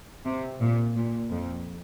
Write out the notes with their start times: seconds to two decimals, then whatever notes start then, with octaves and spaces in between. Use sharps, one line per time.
0.26 C3
0.61 A#2
0.96 A#2
1.31 F2